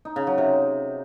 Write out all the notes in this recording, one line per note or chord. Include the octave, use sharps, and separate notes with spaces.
D#4
C#3
F#3
C3